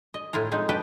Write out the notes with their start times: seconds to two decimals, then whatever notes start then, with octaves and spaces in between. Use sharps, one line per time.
0.14 D#5
0.33 A2 E4 F4 A#5
0.51 F3 G#3 C4 D#4
0.69 G4 A4 B4 D#5 G5 A5